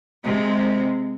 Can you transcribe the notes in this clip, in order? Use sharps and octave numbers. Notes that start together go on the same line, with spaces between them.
C3 G#3